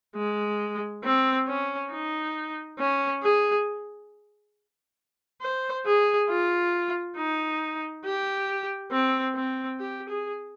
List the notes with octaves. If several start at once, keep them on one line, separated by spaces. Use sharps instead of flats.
G#3
C4
C#4
D#4
C#4
G#4
C5
G#4
F4
D#4
G4
C4
C4
G4
G#4